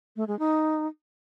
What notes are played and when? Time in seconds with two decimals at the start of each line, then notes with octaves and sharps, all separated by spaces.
0.16 A3
0.28 G#3
0.39 D#4